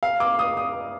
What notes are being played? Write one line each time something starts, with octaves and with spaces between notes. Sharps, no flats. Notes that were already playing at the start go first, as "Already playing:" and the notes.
F5
D6
D#6
D#6